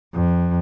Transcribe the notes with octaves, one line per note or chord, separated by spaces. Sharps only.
F2